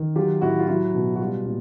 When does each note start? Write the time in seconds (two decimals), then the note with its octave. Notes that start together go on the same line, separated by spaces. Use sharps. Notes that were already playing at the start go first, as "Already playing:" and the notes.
Already playing: D#3
0.16 F#3 F4 G4
0.41 A2 E4 F#4
0.59 F4
0.68 F#3 E4 F#4
0.94 B2
1.15 F#4
1.20 G3 F4
1.45 A#2